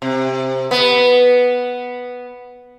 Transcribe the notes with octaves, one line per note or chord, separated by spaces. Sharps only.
C3
B3